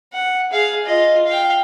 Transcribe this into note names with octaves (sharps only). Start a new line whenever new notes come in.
F#5
G#4 F5
F4 D#5
F5 G5